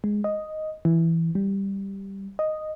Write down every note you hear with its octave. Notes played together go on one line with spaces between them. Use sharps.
G#3
D#5
E3
G3
D#5